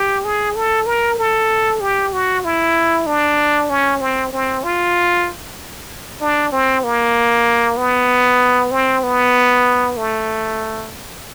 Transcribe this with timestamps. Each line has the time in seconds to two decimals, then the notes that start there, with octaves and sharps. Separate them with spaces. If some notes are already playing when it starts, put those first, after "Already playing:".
Already playing: G4
0.24 G#4
0.56 A4
0.86 A#4
1.18 A4
1.81 G4
2.13 F#4
2.44 E4
3.06 D4
3.70 C#4
4.01 C4
4.33 C4
4.64 F4
6.21 D4
6.52 C4
6.84 A#3
7.77 B3
8.71 C4
9.03 B3
9.97 A3